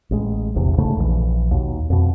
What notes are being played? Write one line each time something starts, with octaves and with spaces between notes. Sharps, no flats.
A1 G#3
E1 A#1 E2 C3
D#2 G#2 C#3 A3
A#1 D3 E3
D#2 B2
F2 B2